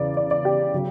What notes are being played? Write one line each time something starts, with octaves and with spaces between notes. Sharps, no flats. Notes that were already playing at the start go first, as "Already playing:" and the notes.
Already playing: E2 C#3 D5
D5
D5
G4
C#3 F#3